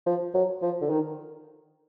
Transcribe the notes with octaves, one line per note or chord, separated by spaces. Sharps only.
F3
F#3
F3
D3
D#3